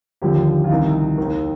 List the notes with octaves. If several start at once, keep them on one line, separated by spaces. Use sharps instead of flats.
D#2 D3 F3 G4
F4
C2 C3 D#3 D#4
D#2 D#3